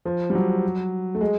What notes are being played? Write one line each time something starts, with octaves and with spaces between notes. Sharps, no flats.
F3
G3
F#3
A3
G#3